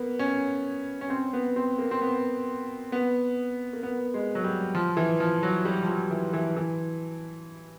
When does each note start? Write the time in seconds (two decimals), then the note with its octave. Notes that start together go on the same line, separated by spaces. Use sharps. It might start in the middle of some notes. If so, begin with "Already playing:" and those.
Already playing: A#3 B3
0.19 C#4
1.01 C#4
1.10 C4
1.33 B3
1.56 C4
1.78 A#3
1.91 C4
2.01 B3
2.92 B3
3.73 A#3
3.83 B3
4.14 G#3
4.35 F#3
4.44 G3
4.75 F3
4.97 E3
5.20 F3
5.43 F#3
5.65 G3
5.83 F3
5.88 F#3
6.11 E3
6.33 E3
6.56 E3